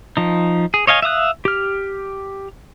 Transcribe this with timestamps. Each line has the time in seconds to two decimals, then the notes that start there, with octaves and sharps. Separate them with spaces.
0.17 F3 D#4
0.74 G#4
0.87 C#5 D#5 F5 G#5
1.02 E5 F5 D#6 F#6
1.45 G4 F6